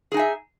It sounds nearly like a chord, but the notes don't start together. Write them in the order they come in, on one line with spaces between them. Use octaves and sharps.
G#4 D#4 G#5 E5